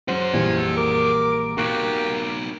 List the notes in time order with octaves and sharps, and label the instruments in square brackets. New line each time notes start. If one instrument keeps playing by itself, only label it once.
[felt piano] F#3 C#4 [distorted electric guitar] G#4 F#5 [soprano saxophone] C5
[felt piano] A#1 E3 G3 [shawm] G#5
[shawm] A4
[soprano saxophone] A#4 [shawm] D6
[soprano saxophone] A#3 [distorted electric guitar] D#4 F#4 [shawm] G4 [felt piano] C#6 F#6 D7